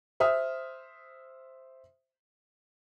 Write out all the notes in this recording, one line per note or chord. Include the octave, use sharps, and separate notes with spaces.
C5 E5 D#6 F6